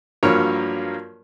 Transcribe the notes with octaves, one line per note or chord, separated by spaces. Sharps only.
G2 F3 F#3 A#3 A#4 C#5